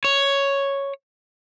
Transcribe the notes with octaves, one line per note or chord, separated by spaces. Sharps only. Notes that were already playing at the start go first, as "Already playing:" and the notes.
C#5